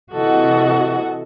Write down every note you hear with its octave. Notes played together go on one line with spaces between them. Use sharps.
C3 E3 F#4 A4 D#5 F#5